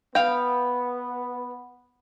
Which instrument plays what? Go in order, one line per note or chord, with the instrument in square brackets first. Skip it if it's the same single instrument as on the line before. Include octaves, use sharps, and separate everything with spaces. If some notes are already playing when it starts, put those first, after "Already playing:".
[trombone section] B3 [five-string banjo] F5 G5